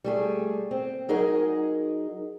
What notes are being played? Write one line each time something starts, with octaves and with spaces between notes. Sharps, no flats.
G3 A3 G#4
C4
F#3 D#4 G#4 A#4 D#5